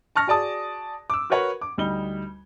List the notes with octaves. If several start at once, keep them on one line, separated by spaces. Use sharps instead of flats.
A5 C#6 F6 A#6
F#4 G#4 D5 A5 D#6
D6 E6
F#4 A#4 B4 C#5 F#5
D6
D2 G3 D#4 G7